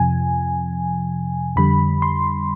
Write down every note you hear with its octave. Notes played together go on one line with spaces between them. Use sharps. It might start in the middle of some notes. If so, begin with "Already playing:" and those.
Already playing: F2 C3 F3 G#5
F2 D3 G3 B5
C6